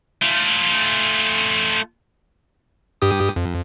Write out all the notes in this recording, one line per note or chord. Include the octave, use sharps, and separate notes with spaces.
A3 F4
G2 G4 D#6
F2